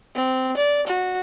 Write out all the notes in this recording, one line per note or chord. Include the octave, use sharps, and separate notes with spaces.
C4
D5
F#4